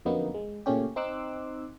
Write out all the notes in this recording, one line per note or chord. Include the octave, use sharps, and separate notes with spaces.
F2 D3 F#3 A#3 B3 D#4
G#3
A#2 C#3 A3 C#4 G4
C4 D#4 C6 D6 E6 F#6